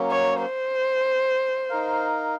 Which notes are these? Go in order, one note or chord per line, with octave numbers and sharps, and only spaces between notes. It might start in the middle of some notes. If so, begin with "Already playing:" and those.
Already playing: F#3 A#3 C#4
C#5
C5
D#4 A#4 F5